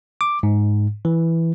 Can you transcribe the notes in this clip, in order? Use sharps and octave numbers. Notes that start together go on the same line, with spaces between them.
D6
G#2
E3